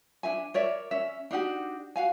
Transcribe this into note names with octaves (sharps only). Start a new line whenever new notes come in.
D4 D#4 E5 G#5
A#4 C#5 D5 E5
C#4 E5
D4 D#4 F#4 G4
F#4 F5 G#5